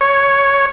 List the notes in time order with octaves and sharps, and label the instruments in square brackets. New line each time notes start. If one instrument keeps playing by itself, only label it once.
[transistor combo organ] C#5